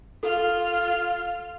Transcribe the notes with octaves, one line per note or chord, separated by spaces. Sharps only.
F4 A4 F6